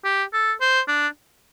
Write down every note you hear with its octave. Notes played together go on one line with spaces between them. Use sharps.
G4
A4
C5
D4